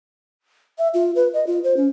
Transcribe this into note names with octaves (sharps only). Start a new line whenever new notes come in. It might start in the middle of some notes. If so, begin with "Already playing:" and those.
E5
F4
B4
D#5
F4
C5
C#4